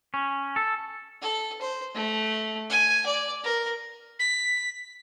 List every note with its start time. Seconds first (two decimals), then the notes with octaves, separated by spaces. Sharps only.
0.14 C#4
0.56 A4
1.22 A4
1.61 C5
1.95 A3
2.70 G#5
3.06 D5
3.44 A#4
4.19 B6